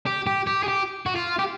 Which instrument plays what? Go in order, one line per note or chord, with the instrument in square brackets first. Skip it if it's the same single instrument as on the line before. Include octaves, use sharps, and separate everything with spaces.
[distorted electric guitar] G4
G4
G4
G#4
G4
F#4
F4
G4